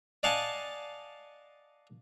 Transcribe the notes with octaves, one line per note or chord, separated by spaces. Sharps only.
D5 D#5 F5 F#5 G#5 A5